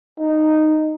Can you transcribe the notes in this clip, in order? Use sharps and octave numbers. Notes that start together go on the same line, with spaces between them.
D#4